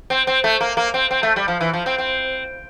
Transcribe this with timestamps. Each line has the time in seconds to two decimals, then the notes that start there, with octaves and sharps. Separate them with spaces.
0.10 C4
0.27 C4
0.44 A3
0.61 A#3
0.77 A#3
0.94 C4
1.11 C4
1.23 A3
1.36 G3
1.48 F3
1.61 E3
1.74 F3
1.86 C4
1.98 C4